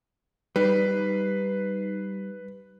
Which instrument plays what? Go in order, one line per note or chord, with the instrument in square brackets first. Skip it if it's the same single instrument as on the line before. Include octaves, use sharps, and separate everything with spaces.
[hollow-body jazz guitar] G3 [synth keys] D#4 C7 [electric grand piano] B4